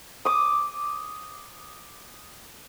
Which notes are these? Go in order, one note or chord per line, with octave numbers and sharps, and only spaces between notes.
D6 D#6